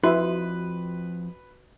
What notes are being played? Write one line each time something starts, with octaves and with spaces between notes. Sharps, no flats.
F2 E4 F#4 B4